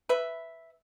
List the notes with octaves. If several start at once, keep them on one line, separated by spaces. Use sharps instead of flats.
B4 E5